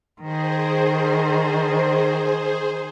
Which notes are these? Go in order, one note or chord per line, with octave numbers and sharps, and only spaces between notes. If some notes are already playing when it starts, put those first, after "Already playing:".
D#3 G#4 C5